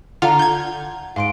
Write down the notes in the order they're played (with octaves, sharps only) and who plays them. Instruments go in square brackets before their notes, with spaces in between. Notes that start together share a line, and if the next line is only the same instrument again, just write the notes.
[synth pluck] D3 F4 F6 [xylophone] F#5 A#5
[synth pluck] G6 G#6
[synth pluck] G#2 [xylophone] F5 C6 D7